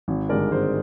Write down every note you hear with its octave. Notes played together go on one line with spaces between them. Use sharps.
G#1
G2 D3 G#3 D4 A#4 D5
G#1 G#4 C5